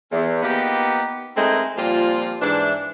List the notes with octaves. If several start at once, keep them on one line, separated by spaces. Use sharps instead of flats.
E2
A#3 B3 D#4 F4 G4
G#3 A3 C4 D#4 E4 A#4
A#2 F3 G3 C4 F4
G#2 E3 D4